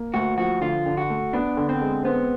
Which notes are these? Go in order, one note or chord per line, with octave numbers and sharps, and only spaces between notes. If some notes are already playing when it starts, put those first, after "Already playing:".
Already playing: A#3
D2 F#4
F3 F#4
D3 F4
D3
F#4
A3
B3 D4
D3
C4
G#3
B3 C4